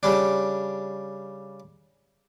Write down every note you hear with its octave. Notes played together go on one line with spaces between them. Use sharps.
C#3 G3 D4